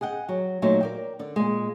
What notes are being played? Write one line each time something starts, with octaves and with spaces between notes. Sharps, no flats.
G#4 D#5 F#5 G5
F#3
A#2 F#3 A3 D#4 C5
A#4 D5 G5
D3 D5
A#2 G#3